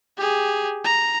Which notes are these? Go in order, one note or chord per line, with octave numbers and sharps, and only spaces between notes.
G4 G#4
A#5